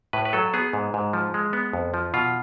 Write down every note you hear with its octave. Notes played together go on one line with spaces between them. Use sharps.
A2 B4
B4
F#3 A4
B3 G#4
G#2
G#2
F3
G#3
B3
F2
F3
B2 F4